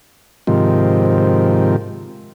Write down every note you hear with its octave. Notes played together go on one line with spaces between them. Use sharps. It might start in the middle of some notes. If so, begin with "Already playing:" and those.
G#2 C3 D#3 F3